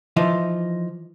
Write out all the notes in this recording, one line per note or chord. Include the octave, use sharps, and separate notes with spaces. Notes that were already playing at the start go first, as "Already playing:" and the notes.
E3 F3 D#4